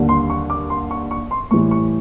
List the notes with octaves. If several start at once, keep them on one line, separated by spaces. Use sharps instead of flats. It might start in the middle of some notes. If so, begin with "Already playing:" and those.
Already playing: D#2 D3 G3
C6
C#6
D6
C6
C#6
C#6
C6
A2 E3 G3 C#6
C#6